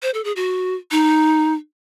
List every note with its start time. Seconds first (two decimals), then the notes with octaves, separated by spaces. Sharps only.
0.03 C5
0.14 A4
0.24 G#4
0.36 F#4
0.91 D#4